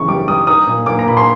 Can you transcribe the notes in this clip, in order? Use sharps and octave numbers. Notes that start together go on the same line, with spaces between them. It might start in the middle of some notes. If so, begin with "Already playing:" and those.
Already playing: C#3 E3 C#6
G3 D6
G3 D#6
D#4 D#6
A#2
A#2 D6
A#5
A#2 B5
C6